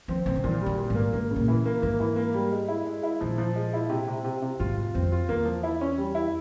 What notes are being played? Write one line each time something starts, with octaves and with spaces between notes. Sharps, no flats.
F3 C4
C3 C4
C#3
A#2 E3
C3 G3
A#2
G#2 A#3
G#2 A#3
C#3
A#2
E3
A#3
G#2 A#3
E3
A#3
G3
G#3
E4
G#3
E4
A#2 F3
F3
G#3
E4
C3
C3
C3
C3
G#2 F4
F4
F2 C4
F4
E2 A#3
F3
E4
C#4
G3
E4